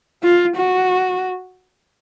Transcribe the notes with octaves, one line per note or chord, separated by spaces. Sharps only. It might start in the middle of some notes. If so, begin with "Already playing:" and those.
F4
F#4